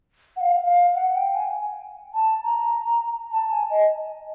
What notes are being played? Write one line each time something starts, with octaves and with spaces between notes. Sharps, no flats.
F#5
F5
F5
F#5
G5
G#5
A5
A#5
A5
G#5
D#5